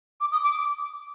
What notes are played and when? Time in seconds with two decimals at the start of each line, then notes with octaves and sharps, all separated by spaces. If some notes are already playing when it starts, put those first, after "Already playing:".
0.21 D6
0.32 D#6
0.44 D6